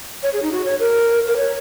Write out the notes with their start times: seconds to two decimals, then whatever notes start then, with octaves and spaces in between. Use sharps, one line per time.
0.23 C#5
0.33 G#4
0.43 D#4
0.52 F#4
0.65 C#5
0.80 A#4
1.27 A#4
1.36 C#5